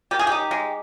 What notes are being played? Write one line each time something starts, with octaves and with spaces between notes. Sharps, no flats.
D#3 G4
G#4
D#4 G4
G#3